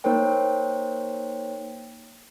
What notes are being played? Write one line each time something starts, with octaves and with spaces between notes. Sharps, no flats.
A#3 D#4 A#4 C5 C#5 G5